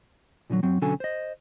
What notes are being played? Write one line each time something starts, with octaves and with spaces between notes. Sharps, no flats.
A#2 D3 E3 F#3
F#2 F#3 C4
B1 D3 F#3 C#4 A4 G#5
C5 D#5